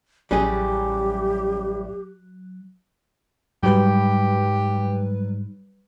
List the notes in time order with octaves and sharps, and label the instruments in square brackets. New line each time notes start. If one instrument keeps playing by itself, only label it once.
[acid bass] A1 [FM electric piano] F#3 [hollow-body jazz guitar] G3 C#4 G#4 [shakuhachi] G4
[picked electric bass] G#2 [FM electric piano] F#3 G3 B4 [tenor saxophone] G4